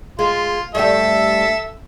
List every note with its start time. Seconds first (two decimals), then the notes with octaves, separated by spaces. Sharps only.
0.19 G#3 F4
0.75 G2 A3 G4 A4 E5